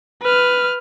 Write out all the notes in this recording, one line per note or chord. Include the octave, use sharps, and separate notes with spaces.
B4 F6